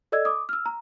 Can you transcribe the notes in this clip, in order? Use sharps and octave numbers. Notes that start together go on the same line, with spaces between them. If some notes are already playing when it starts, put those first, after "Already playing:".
A4 D5 D#5 E6 G#6
D6 D#6
E6 F6
A#5